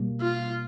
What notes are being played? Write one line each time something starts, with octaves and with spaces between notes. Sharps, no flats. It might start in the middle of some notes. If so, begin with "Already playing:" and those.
Already playing: B2 G3 A#3
F4